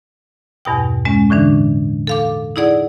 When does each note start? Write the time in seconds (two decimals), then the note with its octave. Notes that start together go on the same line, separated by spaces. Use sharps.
0.65 E2 G2 B2 G5
1.05 G#3 C#4
1.30 A2 D3 E3 D4
2.07 A4 F5 D6
2.56 D#4 E4 G#4 D5 F#5